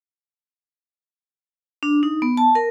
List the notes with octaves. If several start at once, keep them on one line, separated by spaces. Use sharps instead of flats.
D4
D#4
B3
A5
A#4